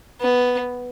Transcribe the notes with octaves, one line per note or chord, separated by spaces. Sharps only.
B3